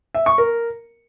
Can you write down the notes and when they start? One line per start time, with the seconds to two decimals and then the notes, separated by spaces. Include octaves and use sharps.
0.15 E5
0.26 C#6
0.38 A#4